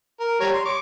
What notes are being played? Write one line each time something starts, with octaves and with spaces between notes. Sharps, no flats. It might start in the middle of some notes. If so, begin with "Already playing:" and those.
A#4
G3 C#5 A#5
C6
C#6 D6